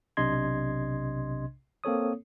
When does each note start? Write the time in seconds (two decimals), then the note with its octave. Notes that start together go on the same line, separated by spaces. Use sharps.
0.17 B1 C3 D4 D#5 C6 G#6
1.84 A#3 C4 A4 C#5 D#6